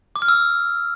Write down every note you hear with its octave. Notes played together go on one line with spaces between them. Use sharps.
D6
F6
E6